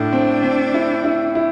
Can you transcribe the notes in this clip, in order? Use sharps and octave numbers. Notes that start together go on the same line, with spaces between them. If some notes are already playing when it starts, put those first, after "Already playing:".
Already playing: A2 D4
C4
C4
E4
E4
E4